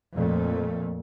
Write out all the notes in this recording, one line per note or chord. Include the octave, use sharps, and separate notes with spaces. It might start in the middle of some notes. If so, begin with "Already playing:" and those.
F2 A#2 A3